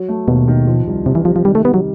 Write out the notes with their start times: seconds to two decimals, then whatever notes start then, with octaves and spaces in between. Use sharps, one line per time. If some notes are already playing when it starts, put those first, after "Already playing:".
Already playing: F#3
0.08 A3
0.28 D#2 B2
0.48 D#3
0.67 F3
0.87 C2
1.06 C2 C3
1.15 E3
1.25 C3 F3
1.36 F3
1.44 D#3 G3
1.55 A3
1.64 G3 B3
1.74 F#3